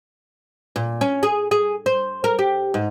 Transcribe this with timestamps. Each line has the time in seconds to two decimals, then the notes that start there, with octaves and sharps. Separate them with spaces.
0.76 A#2
1.01 C#4
1.23 G#4
1.51 G#4
1.86 C5
2.24 A#4
2.39 G4
2.74 G#2